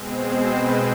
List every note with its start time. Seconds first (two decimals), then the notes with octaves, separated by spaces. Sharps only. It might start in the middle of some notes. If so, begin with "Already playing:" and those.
Already playing: B2 G#3 C4
0.17 C5
0.49 B4